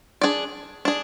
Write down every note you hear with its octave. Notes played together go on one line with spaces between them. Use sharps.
D4 G#4 D5
D4 G#4